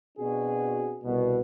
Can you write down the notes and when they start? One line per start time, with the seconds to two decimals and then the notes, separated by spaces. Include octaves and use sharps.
0.18 B2 C4 D4 F#4 G#4
1.04 C2 B2